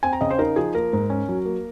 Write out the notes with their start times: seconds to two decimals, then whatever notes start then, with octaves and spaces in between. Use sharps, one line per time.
0.03 C4 G#5
0.13 A#5
0.21 C#3 D#5
0.31 C5
0.38 D#4 A#4
0.56 F3 G#4
0.74 A#3 A#4
0.93 G#2
1.10 C#4
1.29 F#3
1.45 A#3